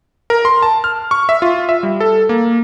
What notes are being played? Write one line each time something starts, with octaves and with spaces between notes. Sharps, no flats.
A#4
C6
A5
F6
C#6
E5
F4
E5
G3
A4
A#3